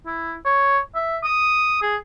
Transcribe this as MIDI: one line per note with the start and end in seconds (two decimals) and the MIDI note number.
0.06 0.34 64
0.45 0.79 73
0.95 1.18 76
1.24 1.78 87
1.82 1.96 68